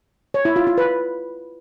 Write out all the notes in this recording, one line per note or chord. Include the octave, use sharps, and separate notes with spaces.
C#5
E4
F4
F4
B4